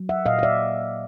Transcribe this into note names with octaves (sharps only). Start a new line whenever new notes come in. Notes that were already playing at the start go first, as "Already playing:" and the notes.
Already playing: F#3
E5 F#5
A#2 D#5 F5
F5
D5 E5